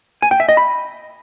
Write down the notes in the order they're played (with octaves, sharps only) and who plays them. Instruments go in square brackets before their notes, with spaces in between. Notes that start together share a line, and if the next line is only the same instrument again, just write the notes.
[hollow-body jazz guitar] G#5
G5
E5
D#5
B5